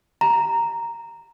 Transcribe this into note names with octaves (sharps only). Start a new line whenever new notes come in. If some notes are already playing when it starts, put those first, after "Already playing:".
A#5